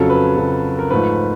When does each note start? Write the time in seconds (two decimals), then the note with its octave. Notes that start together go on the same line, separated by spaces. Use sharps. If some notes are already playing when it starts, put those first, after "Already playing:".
Already playing: F2 C#3 F#3 A4
0.10 B4
0.37 F2 C#3 F#3
0.79 A#4
0.90 G#2 F3 A3 B4